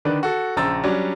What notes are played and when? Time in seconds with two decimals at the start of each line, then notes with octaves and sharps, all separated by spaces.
0.05 D3 D#3 D4 B4
0.23 F#4 A4
0.57 A#1 C#3 C5 A#5 E6 A6
0.84 F#3 G3 C#4 D4